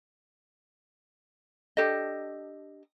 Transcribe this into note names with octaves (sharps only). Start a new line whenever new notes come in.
D4 G4 A4 D#5